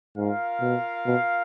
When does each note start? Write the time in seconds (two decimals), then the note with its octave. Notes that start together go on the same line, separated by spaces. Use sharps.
0.17 G#2 F4 A#4 F5
0.61 B2
1.07 B2